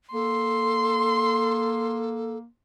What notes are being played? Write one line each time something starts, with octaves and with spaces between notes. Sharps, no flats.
A#3 A4 C6